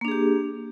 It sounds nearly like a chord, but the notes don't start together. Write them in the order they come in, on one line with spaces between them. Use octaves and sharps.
A#3 D4 G#4 G4